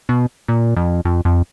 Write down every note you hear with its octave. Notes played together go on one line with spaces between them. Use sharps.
B2
A#2
F2
F2
F2